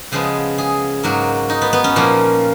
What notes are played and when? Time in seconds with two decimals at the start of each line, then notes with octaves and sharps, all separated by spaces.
0.12 C#3 F3 G#3 B3 G#4
0.58 G#4
1.03 G#2 F#3 A#3 F#4
1.50 D#4
1.62 B3
1.73 B3
1.84 C#4
1.96 A#2 F3 A#3